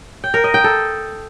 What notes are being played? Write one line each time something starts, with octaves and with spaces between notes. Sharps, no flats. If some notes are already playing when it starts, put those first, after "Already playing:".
G5
A#4
D#5
G5
A4